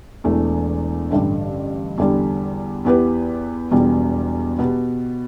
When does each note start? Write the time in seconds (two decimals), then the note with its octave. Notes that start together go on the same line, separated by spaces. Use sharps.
0.24 E1 E2 E3 A3
1.10 A1 G2 D3 G3 D4
1.98 E2 D3 G3 D4
2.85 E2 E3 B3 G4 B4
3.72 E1 E2 B2 G3
4.59 B2 B3 G4